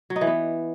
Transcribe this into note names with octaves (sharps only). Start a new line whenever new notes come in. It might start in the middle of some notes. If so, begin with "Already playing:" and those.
F#3
D#4
E3
B3